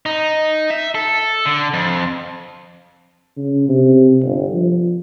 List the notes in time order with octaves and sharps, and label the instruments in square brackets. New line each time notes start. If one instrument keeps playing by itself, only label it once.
[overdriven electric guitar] D#4
E5
A4
D3
F2
[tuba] C#3
C3
G1
F3